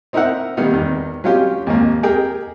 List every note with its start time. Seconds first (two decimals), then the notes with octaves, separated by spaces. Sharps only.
0.13 C4 D#4 E4 A#4 E5 F#5
0.57 D#3 G3 A#3 B3 D#4
0.73 E2 D#3
1.24 F#3 C#4 F4 G4
1.67 D#2 G#2 A#3
2.03 G4 G#4 A#4 G5